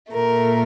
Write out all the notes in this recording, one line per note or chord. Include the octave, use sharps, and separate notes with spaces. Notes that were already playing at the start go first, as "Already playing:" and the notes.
A#2 A3 A#4